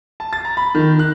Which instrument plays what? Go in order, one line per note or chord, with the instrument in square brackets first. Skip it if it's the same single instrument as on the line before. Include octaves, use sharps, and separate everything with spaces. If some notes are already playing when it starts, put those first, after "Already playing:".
[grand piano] A5
A6
A#5
B5
D#3
F#6